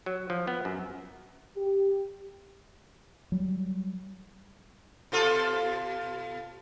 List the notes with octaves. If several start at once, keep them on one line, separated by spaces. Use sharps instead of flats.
F#3
F3
B3
F#2
G4
F#3 G3
B2 F4 A4